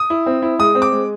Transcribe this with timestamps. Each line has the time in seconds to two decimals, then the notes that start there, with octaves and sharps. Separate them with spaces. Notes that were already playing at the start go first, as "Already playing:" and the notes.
Already playing: D#6
0.10 E4
0.26 C4
0.42 E4
0.59 G#3 D#6
0.75 C4
0.82 D6
0.92 G#3